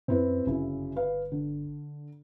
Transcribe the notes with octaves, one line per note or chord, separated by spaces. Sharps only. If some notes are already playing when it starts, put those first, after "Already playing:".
F#2 C4 E4 B4
G1 F#2 C#3 E4
B4 F5
D3